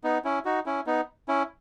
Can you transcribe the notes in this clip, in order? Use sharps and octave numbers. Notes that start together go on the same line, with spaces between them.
B3 D#4
C#4 E4
D#4 F#4
C#4 E4
B3 D#4
C#4 E4